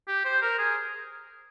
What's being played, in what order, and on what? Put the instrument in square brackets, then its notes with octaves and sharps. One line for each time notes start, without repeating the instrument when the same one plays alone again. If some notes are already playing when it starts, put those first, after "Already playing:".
[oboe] G4
C5
A#4
G#4